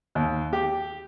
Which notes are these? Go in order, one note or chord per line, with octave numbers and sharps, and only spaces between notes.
D#2
G4